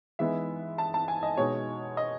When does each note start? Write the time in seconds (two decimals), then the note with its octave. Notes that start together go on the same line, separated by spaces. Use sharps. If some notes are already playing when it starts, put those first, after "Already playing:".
0.19 E3 G#3 B3 D#4 E5
0.78 A5
0.94 A5
1.08 G#5
1.23 D#5
1.37 B2 G#3 D#4 C#5
1.97 D#5